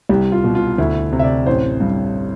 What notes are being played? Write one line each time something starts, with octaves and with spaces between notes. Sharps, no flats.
C2 G4
F4
B2
F4
D2 E4
C3
E5
D5
A1 C5
G2